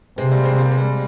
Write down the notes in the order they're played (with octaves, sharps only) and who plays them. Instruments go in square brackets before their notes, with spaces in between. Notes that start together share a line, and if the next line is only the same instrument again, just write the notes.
[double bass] C3 [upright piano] G#3 C4
[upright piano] G3 A#3
G#3 C4
G3 A#3
G#3
G3